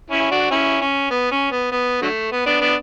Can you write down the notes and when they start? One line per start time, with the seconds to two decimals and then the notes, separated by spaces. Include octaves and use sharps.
0.10 C#4 E4
0.31 D4 F#4
0.51 C#4 E4
0.81 C#4
1.11 B3
1.31 C#4
1.51 B3
1.72 B3
2.02 D3 F#3 A3
2.32 B3
2.46 B3 D4
2.61 B3 D4